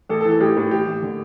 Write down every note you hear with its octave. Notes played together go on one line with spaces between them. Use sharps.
A1 A4
A4
E3
A4
A1 G4
A2 G4
A1 G4
A1
D3